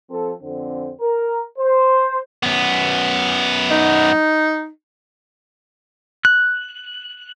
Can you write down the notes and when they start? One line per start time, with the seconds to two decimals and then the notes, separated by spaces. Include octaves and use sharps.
0.11 F3 C4 A4
0.42 F2 D3 C4
1.01 A#4
1.59 C5
2.43 F#2 B3
3.71 D#4
6.25 F#6